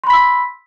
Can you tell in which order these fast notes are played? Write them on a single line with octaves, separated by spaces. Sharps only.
C6 B5 B6 E6